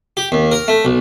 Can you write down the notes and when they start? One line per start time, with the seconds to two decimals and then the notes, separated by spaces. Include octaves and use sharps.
0.17 G4
0.32 D#2
0.52 A#4
0.68 A3
0.85 B1